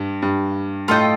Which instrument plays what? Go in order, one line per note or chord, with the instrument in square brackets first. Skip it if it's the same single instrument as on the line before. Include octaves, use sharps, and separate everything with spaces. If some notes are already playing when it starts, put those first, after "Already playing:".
Already playing: [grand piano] G2
G2
[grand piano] A2 [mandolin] F4 A4 D#5 G5